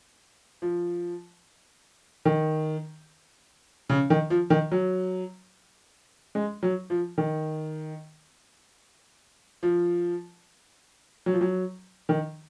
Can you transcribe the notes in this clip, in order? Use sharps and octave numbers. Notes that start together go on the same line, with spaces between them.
F3
D#3
C#3
D#3
F3
D#3
F#3
G#3
F#3
F3
D#3
F3
F#3
F3
F#3
D#3